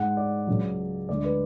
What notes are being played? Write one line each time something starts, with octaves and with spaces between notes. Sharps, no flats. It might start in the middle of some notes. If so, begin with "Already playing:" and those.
Already playing: G#2 G#3 F#5
D5
C#2 C#3 F#3
D2 D3 G#3 D5
B4